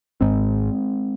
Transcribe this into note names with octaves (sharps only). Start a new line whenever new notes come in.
G#1 G#2 G#3 C4